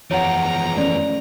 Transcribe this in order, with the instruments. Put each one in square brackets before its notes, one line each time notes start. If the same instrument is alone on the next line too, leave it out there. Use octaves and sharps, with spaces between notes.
[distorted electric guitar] E2 F3 [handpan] F4 [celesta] C#5 F#5 [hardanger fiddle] A#5
[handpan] A3 C#4 [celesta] D5